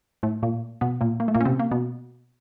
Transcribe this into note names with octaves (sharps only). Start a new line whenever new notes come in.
A2 A3
A#2 A#3
B2 B3
A#2 A#3
A#3
A3
A#2 A#3
C#4
C3 C4
A#3
B2 B3